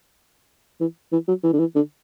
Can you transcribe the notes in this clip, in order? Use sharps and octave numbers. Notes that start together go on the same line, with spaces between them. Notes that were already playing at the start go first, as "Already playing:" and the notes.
E3
E3
F#3
E3
D3
E3
D3